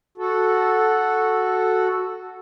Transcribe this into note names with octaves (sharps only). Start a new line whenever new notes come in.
F#4 A4